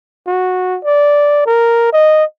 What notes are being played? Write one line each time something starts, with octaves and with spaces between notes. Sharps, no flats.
F#4
D5
A#4
D#5